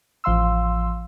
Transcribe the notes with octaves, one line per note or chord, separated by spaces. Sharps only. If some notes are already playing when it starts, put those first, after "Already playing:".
A1 F3 F5 C6 E6